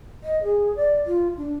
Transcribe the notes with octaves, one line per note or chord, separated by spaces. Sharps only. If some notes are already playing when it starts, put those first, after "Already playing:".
D#5
G#4
D5
F4
D4